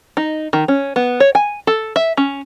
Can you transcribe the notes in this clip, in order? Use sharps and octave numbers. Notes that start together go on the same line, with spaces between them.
D#4
D#3
C#4
B3
C#5
G#5
A4
E5
C#4